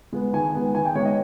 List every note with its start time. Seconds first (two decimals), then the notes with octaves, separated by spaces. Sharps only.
0.13 G#3 B3
0.33 D#3 G#5
0.54 G#3 B3
0.75 D#3 G#5
0.85 G5
0.95 G#3 B3 C#5
1.05 D#5